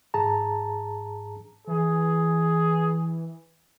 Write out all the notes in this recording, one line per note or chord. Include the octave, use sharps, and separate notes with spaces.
G#2 G#4 A5 A#5
E3 G#4